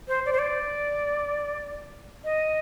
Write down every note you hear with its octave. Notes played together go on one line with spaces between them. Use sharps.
C5
D5
C5
D5
D#5